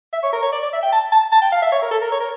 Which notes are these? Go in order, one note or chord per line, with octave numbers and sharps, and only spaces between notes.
E5
C#5
A#4
C#5
D5
D5
E5
G5
A5
A5
A5
G5
F5
E5
C#5
A#4
A4
A#4
C#5
A#4